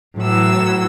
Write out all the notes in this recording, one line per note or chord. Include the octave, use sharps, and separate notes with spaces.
A2 E3 F#3 E6